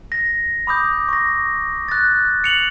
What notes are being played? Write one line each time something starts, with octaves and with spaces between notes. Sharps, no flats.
A#6
B5 D6 D#6 G6
C#6 A#6
F#6 A6
C#7 F7 F#7